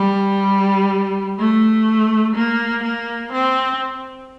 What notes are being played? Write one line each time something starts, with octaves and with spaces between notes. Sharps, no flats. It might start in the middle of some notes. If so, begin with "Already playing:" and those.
Already playing: G3
A3
A#3
A#3
C4